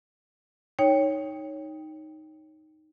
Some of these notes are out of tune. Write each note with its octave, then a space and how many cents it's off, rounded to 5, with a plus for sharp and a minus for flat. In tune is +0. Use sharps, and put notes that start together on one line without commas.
D#4 +0 C#5 +0 G5 +10